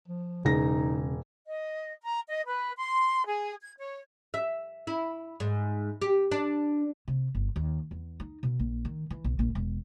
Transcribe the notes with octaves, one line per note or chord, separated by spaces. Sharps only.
F3
E1 C#3 D#4 A#6
D#5
A#5
D#5
B4
C6
G#4
G#6
C#5
E5
E4
G#2
G4
D4
C3
G1
D#2
E2
D#4
B2
A#1
D#3
E3
B1
A#1
E1